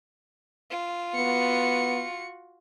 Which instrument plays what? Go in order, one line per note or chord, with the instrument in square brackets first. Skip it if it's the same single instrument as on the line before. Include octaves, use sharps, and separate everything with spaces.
[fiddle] F4
[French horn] B3 [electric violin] F#4 C#7